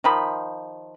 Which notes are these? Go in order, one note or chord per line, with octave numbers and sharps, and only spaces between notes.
D#3 F3 B5